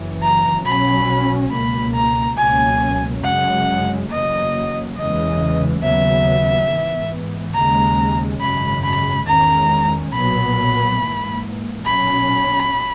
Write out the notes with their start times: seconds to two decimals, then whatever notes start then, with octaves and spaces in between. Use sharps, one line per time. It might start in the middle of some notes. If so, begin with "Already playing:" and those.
Already playing: F#1 F#2 C#3 E3
0.22 A#5
0.65 B1 B2 F#3 C#4 B5
1.51 C#2 B2 A#3 B5
1.94 A#5
2.37 C#2 B2 F#3 A#3 C#4 G#5
3.24 F#2 C#3 G#3 F#5
4.09 F#1 E2 C#3 F#3 A#3 D#5
4.97 F#1 E2 C#3 E3 G#3 D#5
5.82 D#2 C#3 F#3 B3 E5
6.68 G#2 E3 B3
7.54 D#2 C#3 G#3 A#5
8.41 G#1 F#2 C#3 G#3 B5
8.84 B5
9.27 E2 D#3 G#3 C#4 A#5
10.12 B1 A#2 F#3 B3 B5
11.00 G#2 E3 A#3
11.86 B1 A#2 F#3 C#4 B5